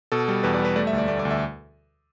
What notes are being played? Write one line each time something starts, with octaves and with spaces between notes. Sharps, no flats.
B2 A4
G3
E2 B4
D5
G3
B4
A3 D5
E5
D2
D5
A3 D5
D5
D2
E5